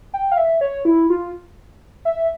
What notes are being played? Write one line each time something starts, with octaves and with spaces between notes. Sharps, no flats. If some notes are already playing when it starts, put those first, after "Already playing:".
G5
F5
E5
C#5
E4
F4
E5